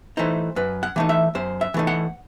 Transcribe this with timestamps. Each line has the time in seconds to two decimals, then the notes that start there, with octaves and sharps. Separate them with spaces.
0.17 E3 A3 D#4 C5
0.56 F#2 B4
0.83 F#5
0.96 E3 A3 D#4
1.09 E5
1.35 F#2 C5
1.61 E5
1.74 E3 A3 D#4
1.87 F#5